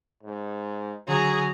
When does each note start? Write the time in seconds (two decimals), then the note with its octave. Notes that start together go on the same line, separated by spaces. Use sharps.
0.23 G#2
1.08 D3 F#3 G#4 A#5